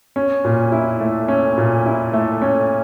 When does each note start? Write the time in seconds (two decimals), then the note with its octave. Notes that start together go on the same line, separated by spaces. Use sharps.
0.16 C#4
0.45 A#2
0.72 E4
1.01 A3
1.28 C#4
1.58 A#2
1.86 E4
2.13 A3
2.42 C#4